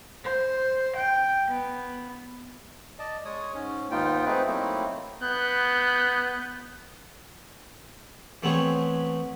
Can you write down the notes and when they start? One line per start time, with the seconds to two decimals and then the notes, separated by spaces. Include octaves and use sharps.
0.24 C5
0.97 G5
1.48 B3
2.99 D5 D#5 A5
3.25 G#3 C#5 D#6
3.54 G#2 C#4
3.91 D#2 G#2 B3 D#4 F4 G5
4.26 A3 C4 D#4 G#4 B4 C5
4.46 F#3 A3 A#3 C4 D#4 E4
5.22 B3 F#6 G6
8.43 E3 A3 B3 C4 G#4 C#5